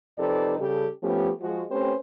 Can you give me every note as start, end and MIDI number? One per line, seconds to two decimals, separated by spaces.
0.19 0.57 41
0.19 0.57 48
0.19 0.57 63
0.19 0.57 69
0.19 0.57 71
0.19 0.57 74
0.58 0.87 49
0.58 0.87 55
0.58 0.87 67
0.58 0.87 69
1.03 1.30 53
1.03 1.30 57
1.03 1.30 59
1.03 1.30 61
1.03 1.30 67
1.41 1.63 53
1.41 1.63 56
1.41 1.63 66
1.70 1.94 57
1.70 1.94 60
1.70 1.94 61
1.70 1.94 67
1.70 1.94 71
1.70 1.94 72